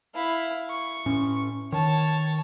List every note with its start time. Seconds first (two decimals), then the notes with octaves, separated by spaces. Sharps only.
0.15 E4 F5
0.70 C#6
1.06 A2 C#4
1.72 D#3 C#5 A5